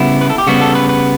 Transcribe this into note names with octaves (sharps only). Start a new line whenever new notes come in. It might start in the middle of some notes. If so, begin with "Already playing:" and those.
Already playing: C#3 G3 B3 E4
B4
A4
G4
C#3 G3 B3 F#4
A4
B4
B4